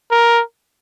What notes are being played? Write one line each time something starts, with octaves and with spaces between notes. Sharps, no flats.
A#4